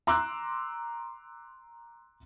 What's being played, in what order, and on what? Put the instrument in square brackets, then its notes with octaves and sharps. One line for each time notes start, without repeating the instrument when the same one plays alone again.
[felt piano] A#5 C6 D6 E6 F#6